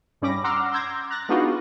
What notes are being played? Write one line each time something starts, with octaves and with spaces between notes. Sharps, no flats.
G2 G3 C#4 B5 D6 A#6
F#5 A#5 C6 D6 E6 F6
C6 D6 E6 G6 G#6 A#6
A#5 F#6 A6 A#6
G#3 B3 D4 D#4 F4 F#4